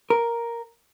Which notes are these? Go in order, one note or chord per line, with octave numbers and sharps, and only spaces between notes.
A#4